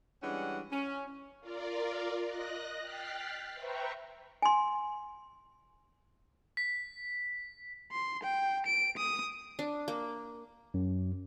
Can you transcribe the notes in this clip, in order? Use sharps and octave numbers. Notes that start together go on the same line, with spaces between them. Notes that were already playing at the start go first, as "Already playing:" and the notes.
E3 G3 G#3 C#4 D4 F#5
C#4
F4 A#4 D5
D#5 F#6 A#6
G5 F6 F#6 A6 B6 C7
B4 C5 E5 G5 A#5 C#6
G#5 C6
B6
C6
G5
D7
D#6
D4
A#3
F#2